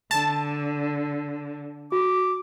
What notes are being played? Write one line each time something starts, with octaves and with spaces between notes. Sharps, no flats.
D3 A5
F#4 D6